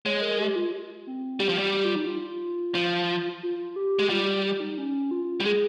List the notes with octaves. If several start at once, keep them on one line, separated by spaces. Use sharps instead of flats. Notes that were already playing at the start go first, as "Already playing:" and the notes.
G#3 C#5
A#4
G4
F4
C4
G3 G4
F3
G3
G4
F4
D#4
F4
F3
F4
G4
G#3
G3 F4
G4
G4
D#4
C#4
F4
G3
G#3 G#4